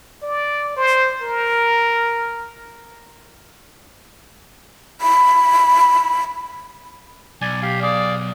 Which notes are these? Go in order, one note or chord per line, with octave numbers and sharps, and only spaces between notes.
D5
C5
A#4
B5
B1 D5 G#5
G4 F5
G#4 D5 F5